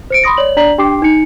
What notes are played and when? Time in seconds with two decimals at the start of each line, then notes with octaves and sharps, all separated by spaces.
0.10 C5 C#7 D7
0.24 B5 C6 D#6 A#6
0.37 C#5 D5 F#7
0.57 D4 D5 A#5 B6 F#7
0.78 D4 G4 G5 D6 C7
1.02 D#4 C#7